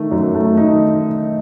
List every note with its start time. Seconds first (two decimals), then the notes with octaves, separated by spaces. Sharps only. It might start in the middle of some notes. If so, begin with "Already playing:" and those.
Already playing: D#3 A3
0.11 F#2
0.35 A3
0.57 D#4